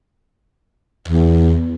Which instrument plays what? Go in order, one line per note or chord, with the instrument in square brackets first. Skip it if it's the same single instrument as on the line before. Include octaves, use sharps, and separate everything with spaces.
[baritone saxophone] E2